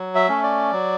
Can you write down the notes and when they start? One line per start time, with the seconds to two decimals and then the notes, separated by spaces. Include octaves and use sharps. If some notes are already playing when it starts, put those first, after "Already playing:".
Already playing: F#3
0.15 E5
0.29 A3 C#4
0.43 D5
0.72 F#3